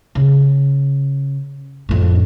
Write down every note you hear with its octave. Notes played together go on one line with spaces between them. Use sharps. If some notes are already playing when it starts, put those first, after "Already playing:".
C#3
F2 A2